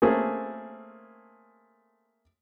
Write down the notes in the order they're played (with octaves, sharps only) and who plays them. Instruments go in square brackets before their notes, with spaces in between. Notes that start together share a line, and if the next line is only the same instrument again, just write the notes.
[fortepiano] A3 A#3 C4 C#4 G#4 A4